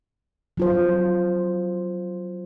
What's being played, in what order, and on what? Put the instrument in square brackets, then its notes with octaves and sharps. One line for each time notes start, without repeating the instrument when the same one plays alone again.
[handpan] F#3 F4 C5